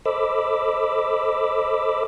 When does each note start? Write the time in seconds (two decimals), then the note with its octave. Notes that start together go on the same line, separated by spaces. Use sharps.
0.06 A4 C5 D#5 B5 D6 E6